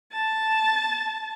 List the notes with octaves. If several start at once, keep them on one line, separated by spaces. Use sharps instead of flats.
A5